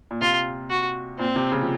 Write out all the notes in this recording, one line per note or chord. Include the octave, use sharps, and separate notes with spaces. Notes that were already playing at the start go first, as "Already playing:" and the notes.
A#2
C3 F4
F#4
A#2 C4
C3
C#3
F3